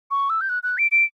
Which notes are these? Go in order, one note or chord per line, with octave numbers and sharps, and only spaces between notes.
C#6
E6
G6
F#6
F#6
D7
D7